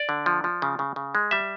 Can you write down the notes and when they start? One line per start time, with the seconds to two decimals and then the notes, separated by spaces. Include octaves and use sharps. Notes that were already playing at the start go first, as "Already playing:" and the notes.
Already playing: D5
0.09 D3
0.26 F3
0.44 F3
0.62 C#3
0.79 C#3
0.96 C#3
1.15 G#3
1.31 G3 E5